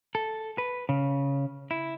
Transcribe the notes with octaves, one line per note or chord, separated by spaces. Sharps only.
A4
B4
C#3
E4